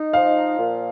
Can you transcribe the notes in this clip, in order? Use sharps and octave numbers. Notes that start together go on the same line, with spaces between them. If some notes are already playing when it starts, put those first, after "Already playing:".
Already playing: D#4
F3 F5
A#2